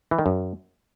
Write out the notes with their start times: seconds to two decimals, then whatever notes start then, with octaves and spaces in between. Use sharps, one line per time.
0.11 E3
0.19 D#3
0.26 F#2